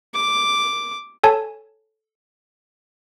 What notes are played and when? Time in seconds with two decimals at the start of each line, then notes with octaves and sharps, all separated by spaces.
0.15 D6
1.23 A4 C#5 G#5 A5